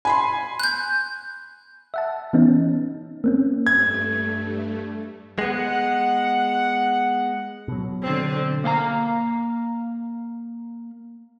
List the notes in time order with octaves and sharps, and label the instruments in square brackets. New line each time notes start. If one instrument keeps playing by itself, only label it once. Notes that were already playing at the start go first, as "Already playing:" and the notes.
[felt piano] G#5 B5 C6
[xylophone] F#6 G6
[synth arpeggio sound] E5 F#5 A5
E3 B3 C#4 D#4
A#3 C4 C#4
[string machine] G2 A3 [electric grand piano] G#6
[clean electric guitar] G#3 B3 [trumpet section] F#5
[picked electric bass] B2 F#3
[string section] D3 C4
[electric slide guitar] A#3 F5 G5 A#5